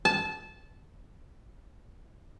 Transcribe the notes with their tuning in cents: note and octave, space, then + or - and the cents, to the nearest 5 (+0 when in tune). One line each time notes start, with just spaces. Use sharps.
A5 -20